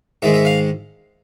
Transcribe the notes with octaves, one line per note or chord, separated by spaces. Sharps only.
G#2 D#3 G#3 E5
E5
F5